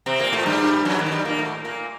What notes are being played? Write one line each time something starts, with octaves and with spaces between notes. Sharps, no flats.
C3 C4
A#2 A#3
A2 A3
G2 G3
F#2 F#3
D#2 D#3
F#3
G2 G3
A#2 A#3
A2 A3
A#2 A#3